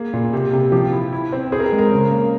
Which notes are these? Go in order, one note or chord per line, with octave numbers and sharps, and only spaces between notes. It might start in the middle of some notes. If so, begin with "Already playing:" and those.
Already playing: A#3 G#4
A#2
C3
C3
F3 G4
E4
E4
C4
C4 G#4
A#4
G#4
G#3
A#4
C#3
A#3